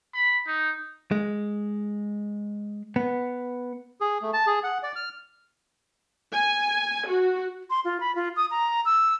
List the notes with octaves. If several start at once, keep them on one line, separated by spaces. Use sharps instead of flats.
B5
D#4
G#3
B3
G#4
A3
A5
G#4
F#5
D5
F6
G#5
F#4
C6
F4
B5
F4
D#6
A#5
E6